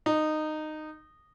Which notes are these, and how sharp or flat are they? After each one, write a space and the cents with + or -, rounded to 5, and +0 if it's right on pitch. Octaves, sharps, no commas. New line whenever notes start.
D#4 -15